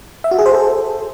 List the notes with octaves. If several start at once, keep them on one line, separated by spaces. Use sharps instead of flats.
E5
F#4
G#4
C5
A4